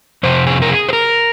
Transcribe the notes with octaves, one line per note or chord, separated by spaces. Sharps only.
F2 C3 C5
G#4
A#4
G#4
C5
A#4